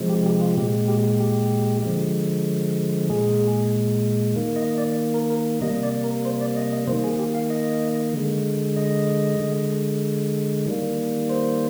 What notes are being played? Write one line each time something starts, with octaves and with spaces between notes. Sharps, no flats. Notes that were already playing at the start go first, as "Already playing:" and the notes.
Already playing: C3 F3 G#3
G4
G4
F4
A#2 G#3 G4
G4
G4
D3 F3 G#3
A#2 G#3 G#4
D#3 A#3
D#5
D5
A#4
A#4
C3 G3 A#3 D#5
D5
A#4
C5
D5
D#5
D#5
D#3 A#3 C5
G#4
G4
F5
D#5
D3 G#3
D#5
D3 G#3
D#3 G3 A#3
C5